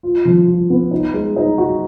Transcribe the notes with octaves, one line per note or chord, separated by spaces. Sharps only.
F4
F3
F4
B3
D#4
G#3
D#4
F#4